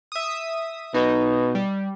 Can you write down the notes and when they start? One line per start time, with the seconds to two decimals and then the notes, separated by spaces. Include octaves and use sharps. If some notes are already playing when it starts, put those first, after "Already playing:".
0.12 E5 D#6
0.94 B2 D#4
1.55 G3